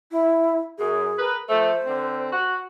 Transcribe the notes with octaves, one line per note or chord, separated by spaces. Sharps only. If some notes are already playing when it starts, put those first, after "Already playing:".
E4
F#2 G#4
A#4 B4
F3 A3 C5
D3 C4
F#4